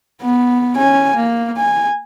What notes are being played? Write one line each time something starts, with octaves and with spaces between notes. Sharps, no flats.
B3
C#4 G#5
A#3
G#5